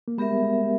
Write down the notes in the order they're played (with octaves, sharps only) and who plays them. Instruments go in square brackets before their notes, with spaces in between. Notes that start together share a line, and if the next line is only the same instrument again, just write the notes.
[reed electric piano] A#3
[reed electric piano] G#3 [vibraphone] B3 G4 A#4 E5
[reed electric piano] G3
G#3